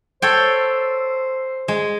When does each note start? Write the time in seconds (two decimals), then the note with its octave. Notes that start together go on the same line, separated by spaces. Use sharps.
0.22 A4 C5 C#5 G5
1.68 G#3